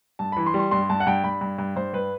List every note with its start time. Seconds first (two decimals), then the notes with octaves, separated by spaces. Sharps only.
0.19 G2 A5
0.32 E3 B5
0.46 C6
0.54 G3
0.59 C6
0.71 G2 C6
0.89 G2 A5
1.00 F#5
1.07 G2 G5
1.24 G2 B5
1.41 G2
1.58 G2
1.76 G2 C5
1.93 G2 B4